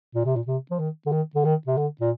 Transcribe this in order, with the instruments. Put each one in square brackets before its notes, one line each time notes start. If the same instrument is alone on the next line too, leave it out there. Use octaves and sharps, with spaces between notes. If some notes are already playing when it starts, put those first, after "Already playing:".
[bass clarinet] A#2
C3
A#2
C3
F3
D#3
D3
D#3
D3
D#3
C3
D3
A#2